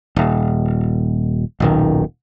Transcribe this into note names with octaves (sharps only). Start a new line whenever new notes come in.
D#1
D#1 B1 D#3